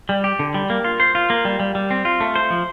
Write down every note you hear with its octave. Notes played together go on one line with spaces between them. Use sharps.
G3
G4
D3
G3
A#3
F4
C5
F4
A#3
G3
G3
G3
C4
F4
A3
C5
F3